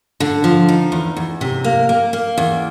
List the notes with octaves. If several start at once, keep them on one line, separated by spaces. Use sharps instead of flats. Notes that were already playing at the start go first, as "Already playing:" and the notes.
D3
F3
D#4
E2
E2
C3
A#3
A#3
A#3
E2